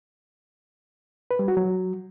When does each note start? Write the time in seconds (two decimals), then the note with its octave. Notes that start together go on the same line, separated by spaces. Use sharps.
1.31 B4
1.39 G3
1.48 F#4
1.57 F#3